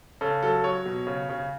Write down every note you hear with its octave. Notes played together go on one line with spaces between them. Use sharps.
C#3 A4
F#3 A4
F#3 C#5
B2
C#3
C#3